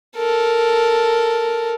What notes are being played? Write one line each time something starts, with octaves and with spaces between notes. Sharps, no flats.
A4 A#4